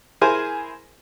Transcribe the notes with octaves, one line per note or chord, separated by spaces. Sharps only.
E4 G#4 A#4 C5 G#5